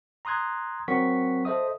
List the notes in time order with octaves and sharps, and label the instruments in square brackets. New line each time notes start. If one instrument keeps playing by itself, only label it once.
[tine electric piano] A#5 C6 D#6 F#6 G#6
F#3 C4 A#4 F#5 C#6 B6
A4 C5 D#5 E5 D#6